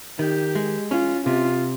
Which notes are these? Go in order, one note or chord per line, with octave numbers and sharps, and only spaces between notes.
D#3 G4
G#3
C#4 F4
C3 F4